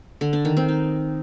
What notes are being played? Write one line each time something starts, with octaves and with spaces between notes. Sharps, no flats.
D3
D4
D#3
C4
D#4